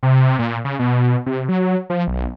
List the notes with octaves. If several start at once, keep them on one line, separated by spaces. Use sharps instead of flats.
C3
A#2
C#3
B2
C3
F#3
F3
B1